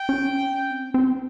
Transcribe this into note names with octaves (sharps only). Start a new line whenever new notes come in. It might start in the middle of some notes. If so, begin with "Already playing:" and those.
Already playing: G5
C#4
C4
C4